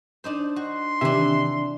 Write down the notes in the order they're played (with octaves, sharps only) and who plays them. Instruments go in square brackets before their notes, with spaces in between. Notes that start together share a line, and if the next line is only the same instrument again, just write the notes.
[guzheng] D4 D#4 C5
[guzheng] F#4 [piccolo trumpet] C6
[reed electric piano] C3 D#3 E5 [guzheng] E3 D4